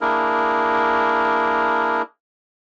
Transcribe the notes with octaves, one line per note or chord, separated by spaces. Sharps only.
A#3 D4 E4 G#4 A#4